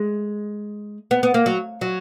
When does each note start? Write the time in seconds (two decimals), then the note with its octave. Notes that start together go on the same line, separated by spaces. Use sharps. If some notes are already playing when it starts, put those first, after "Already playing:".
Already playing: G#3
1.11 B3
1.23 B3
1.34 A#3
1.46 F#3
1.81 F#3